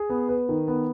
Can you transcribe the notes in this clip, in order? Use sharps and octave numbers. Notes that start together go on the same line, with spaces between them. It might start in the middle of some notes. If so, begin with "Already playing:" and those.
Already playing: G#4
B3
B4
D#3
B3